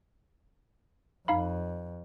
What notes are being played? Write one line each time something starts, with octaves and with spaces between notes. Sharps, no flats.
F2 D#4 F5 B5